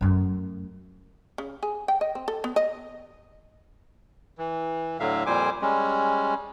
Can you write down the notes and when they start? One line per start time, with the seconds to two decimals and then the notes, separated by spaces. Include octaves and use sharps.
0.01 F#2 A3
1.38 C#3
1.63 G#4
1.88 G5
2.01 D#5
2.15 C4
2.28 A4
2.44 B3
2.56 D#5
4.38 E3
5.00 A2 D3 F#3 E5 F5
5.26 F2 A#2 G3 C5 G#5 D6
5.61 G3 G#3 C#4